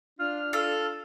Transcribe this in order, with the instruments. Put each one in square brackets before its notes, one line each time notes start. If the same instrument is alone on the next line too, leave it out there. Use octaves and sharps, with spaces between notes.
[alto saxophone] D4 [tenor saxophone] F4 [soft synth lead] F6
[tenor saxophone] F4 [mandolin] A4